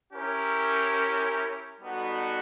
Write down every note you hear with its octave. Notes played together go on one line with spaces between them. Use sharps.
C#4 E4 G4 A#4 C#5
G3 B3 D#4 F#4 A4